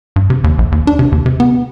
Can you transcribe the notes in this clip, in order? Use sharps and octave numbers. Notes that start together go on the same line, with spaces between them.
G2
C3
D#2
A#1
D#2
D4
C3
D#2
C3
B3